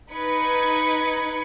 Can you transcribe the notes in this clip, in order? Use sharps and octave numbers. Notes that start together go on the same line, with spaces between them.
D#4 B4 G#6 C#7